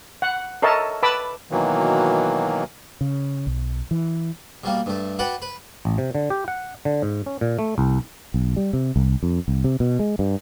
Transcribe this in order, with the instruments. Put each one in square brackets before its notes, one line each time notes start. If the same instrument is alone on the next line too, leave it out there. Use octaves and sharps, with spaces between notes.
[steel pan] F#5
A4 A#4 C#5 D#5 E5 A5
B4 A5 B5 D6 E6
[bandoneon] B2 D#3 E3 F#3 A#3
[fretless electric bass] C#3
B1
E3
[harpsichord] B2 G3 A#3
G2 A3
F#4 B4 D5 F#5 G5
B4
[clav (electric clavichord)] A1
C3
D3
G4
F#5
D3
G#2
C#4
A#2
A3
C2
[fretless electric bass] B1
G3
C3
C2
F2
C2
C3
B2
G#3
G2